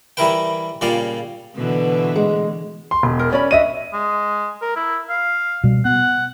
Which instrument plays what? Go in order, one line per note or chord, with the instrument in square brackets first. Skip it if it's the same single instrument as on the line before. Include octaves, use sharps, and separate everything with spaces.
[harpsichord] E3 G3 E4 A#4 B4 G5
A#2 C#3 G3 D5 F5
[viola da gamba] B2 D3 E3
[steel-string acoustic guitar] G#3
[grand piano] C6
E1
[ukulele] A#4
[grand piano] C#4 [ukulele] D5 B5
[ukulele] D4 D#5 E5 [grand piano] D#7
[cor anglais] G#3
A#4
E4
F5
[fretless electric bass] B2 G3
[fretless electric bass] B3 [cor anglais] F#5